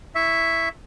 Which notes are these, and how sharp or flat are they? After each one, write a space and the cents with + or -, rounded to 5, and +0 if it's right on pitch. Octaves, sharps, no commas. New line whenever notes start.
E4 +0 E5 +0 C#6 +0